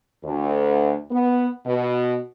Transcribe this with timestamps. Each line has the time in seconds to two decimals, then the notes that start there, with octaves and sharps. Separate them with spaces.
0.24 D2
1.11 B3
1.66 B2